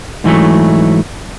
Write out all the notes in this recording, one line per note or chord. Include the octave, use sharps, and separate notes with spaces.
G#2 E3 F#3 A3